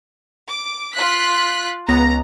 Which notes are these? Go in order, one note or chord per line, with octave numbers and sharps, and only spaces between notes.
D6
F4 F#6 B6
C#2 B3 A#5 A#6